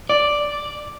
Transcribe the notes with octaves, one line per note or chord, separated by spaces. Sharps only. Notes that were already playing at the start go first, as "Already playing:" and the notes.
D5